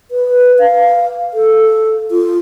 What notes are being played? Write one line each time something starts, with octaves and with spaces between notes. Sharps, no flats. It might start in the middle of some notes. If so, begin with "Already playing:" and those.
B4
F5
A4
F4